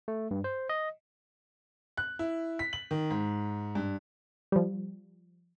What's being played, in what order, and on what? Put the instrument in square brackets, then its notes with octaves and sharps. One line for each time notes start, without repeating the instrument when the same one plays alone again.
[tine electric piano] A3
G2
C5
D#5
[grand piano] F#6
E4
B6
F#7
D#3
G#2
G2
[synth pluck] F3 G3